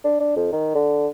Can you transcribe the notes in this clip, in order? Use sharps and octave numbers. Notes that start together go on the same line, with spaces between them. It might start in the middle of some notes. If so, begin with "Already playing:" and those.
D4
D4
F2
D#3
D3